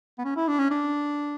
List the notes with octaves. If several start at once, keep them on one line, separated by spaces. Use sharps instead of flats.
B3
C#4
E4
D4
C#4
D4